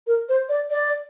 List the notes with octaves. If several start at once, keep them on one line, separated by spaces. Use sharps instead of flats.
A#4
C5
D5
D5